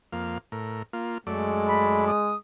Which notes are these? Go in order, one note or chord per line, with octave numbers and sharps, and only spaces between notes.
F2 A#3 F5
A2 A#4
A#3 F4
F#2 G#3 A3 D5
B5
D#6